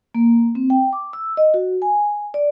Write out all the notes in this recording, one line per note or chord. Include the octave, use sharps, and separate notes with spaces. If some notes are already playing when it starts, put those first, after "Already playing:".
A#3
C4
G5
D6
E6
D#5
F#4
G#5
D5